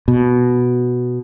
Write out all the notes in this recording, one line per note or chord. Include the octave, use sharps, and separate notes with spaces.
B2